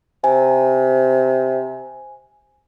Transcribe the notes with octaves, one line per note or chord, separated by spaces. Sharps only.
C3 G#5